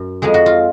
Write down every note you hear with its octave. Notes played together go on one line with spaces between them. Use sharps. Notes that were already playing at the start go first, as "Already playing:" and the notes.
Already playing: F#2
F2 F3 G#3 G#4
F#4
F4